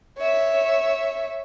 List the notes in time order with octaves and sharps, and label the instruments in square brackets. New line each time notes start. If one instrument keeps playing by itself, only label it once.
[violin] C#5 E5